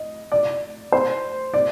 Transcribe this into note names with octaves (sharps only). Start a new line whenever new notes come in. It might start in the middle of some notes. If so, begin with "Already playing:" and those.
Already playing: D#5
D5
C5
D5